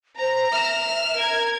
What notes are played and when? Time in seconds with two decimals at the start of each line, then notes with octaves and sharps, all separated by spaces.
0.19 C5 A#5
0.52 E5 F6 E7
1.15 A#4 G#6